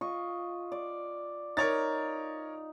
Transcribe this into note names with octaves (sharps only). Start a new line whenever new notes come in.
F4 D#5 C#6
D5
D#4 A#4 C#5 A6